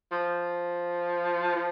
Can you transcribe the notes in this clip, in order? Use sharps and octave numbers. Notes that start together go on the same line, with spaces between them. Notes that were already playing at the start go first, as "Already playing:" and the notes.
F3
F3